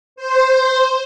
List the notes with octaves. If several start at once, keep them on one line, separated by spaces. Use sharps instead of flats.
C5